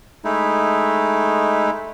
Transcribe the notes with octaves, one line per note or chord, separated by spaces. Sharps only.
G#3 A3 D#4 E4